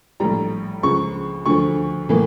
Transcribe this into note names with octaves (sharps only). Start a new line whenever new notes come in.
A#1 A2 G3 A#5
C#2 C#3 F3 C#6
D2 D3 F3 C#6
A2 E3 A#3